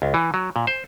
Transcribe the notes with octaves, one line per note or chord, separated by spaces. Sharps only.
C#2
E3
F#3
A#2
C5